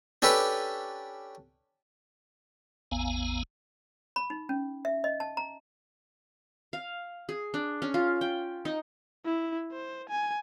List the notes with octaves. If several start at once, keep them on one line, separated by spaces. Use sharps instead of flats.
C#4 D4 G4 A4 B4
A1 E2 B3 F5 G#5 A#5
B5
D#4
C#4
E5
D#5
A5
A#5
F5
G#4
D4
C#4
F4
G5
D#4
E4
C5
G#5